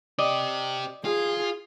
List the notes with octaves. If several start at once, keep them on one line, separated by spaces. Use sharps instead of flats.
C4 G4 D5 D#5
F4 G#4